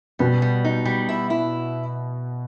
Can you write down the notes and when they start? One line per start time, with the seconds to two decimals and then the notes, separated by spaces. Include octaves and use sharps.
0.19 B2 G3 B3
0.42 G3
0.65 D#4
0.85 G3
1.09 E4
1.30 E4